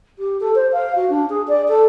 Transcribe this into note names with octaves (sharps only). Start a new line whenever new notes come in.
G4
A4
C5
F5
F#4
D4
G#4
D5
A4